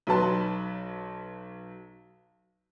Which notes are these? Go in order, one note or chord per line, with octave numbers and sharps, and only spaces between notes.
B1 F#3 B4 A5 C6